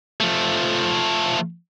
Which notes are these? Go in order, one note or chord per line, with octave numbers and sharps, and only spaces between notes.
F3 A3